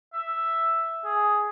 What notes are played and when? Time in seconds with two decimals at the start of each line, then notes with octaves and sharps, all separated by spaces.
0.13 E5
1.05 G#4